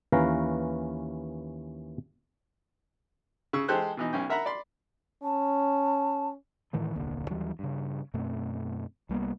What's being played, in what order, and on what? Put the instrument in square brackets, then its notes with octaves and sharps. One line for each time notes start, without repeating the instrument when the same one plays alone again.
[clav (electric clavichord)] D#2 E3 C#4 B4 F5 A#5
[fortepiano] C#3 C#6 E6
E3 G#3 G4 A4 C5 F#6
B2 E3 D#4
B1 C#4 G5
A#4 E5 F#5 A#5 B5
D5 B5 C6
[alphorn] C#4 [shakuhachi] A5
[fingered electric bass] A2 D#3 E3 A3
D#1 C2 D3 A#3
D#2 E3 F#3 G3
G2 C#3
F#2 B2 A3 C4
C2 G3 A#3 B3